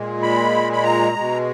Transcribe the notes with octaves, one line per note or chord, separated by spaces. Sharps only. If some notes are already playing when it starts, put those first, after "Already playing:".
Already playing: A#2 G#3
B5
B5
A#5
B2 G#3